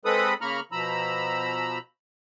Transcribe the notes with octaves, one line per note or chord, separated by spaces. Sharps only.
G#3 C4 A4 B4 B5 D#6
C#3 A#3 A#5 B5 C#6 F6
B2 F3 A#5 B5 E6